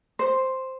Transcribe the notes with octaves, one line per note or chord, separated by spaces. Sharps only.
C5